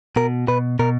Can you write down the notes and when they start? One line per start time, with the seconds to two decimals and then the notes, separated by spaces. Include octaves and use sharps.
0.16 B2 A#4
0.48 B2 B4
0.79 B2 A#4